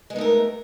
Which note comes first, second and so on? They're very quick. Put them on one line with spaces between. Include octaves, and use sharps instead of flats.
G#3 B3 D#4 A3 A#4